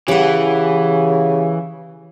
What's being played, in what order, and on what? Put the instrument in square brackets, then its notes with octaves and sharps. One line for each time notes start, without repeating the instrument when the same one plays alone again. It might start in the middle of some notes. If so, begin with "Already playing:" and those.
[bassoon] C#3 [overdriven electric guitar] E3 [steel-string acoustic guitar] G4 F#5